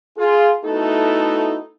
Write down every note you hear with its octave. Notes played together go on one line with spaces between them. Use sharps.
F4 G#4
A3 B3 D#4 E4 F#4 A4